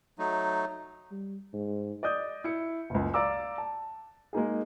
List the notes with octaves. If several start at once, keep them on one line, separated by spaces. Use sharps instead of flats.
F#3 A3 D#4
G3
G#2
D5 D#5 D#6 G6
E4 C#7
F#1 C#2
D5 F5 A#5 D6 E6
A5
G#3 A#3 D#4 G#4